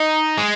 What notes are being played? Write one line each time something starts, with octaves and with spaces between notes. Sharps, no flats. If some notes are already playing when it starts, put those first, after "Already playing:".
Already playing: D#4
G#3